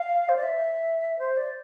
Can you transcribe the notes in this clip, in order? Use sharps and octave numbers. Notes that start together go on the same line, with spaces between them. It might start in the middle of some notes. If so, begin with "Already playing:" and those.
Already playing: F5
C5
D5
E5
C5
D5